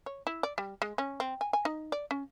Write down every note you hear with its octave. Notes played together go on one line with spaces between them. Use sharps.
C#5
E4
D5
G3
G#3
C#4
C4
G#5
G#5
D#4
D5
C#4